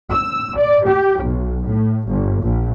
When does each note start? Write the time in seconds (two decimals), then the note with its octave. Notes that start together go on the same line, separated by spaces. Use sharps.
0.12 E6
0.58 D5
0.86 G4
1.24 B1
1.67 A2
2.09 G1
2.43 A#1